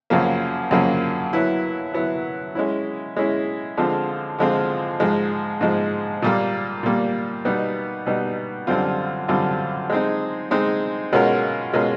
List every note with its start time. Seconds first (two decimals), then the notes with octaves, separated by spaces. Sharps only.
0.10 F#2 C#3 F3 A#3
0.71 F#2 C#3 F3 A#3
1.33 F#3 B3 E4
1.94 F#3 B3 E4
2.55 G#3 C#4 E4
3.16 G#3 C#4 E4
3.77 D3 F3 G#3 C4 F4
4.39 D3 F3 G#3 C4 F4
5.00 G#2 F3 G#3
5.61 G#2 F3 G#3
6.22 A#2 G3 A#3
6.83 A#2 G3 A#3
7.45 B2 G3 B3 D#4
8.06 B2 G3 B3 D#4
8.67 F#2 D3 G3 C4 F4
9.28 F#2 D3 G3 C4 F4
9.90 G#3 C4 D#4
10.51 G#3 C4 D#4
11.13 B2 G#3 C#4 F4 A#4
11.73 B2 G#3 C#4 F4 A#4